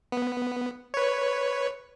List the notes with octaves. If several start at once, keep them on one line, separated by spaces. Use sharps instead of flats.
B3
B4 C#5